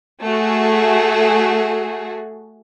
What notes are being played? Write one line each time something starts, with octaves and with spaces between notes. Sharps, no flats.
A3 F#4 G#4